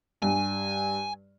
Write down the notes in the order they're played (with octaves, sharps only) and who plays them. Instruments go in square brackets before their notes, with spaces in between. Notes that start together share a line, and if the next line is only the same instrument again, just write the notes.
[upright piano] G2 [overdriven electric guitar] G#5